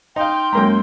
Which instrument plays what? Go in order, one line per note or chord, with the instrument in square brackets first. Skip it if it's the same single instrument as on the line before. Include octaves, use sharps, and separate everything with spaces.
[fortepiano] D#4 F5 [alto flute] G5 [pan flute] C6
[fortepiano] F#2 A#3 A#5 [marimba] G#3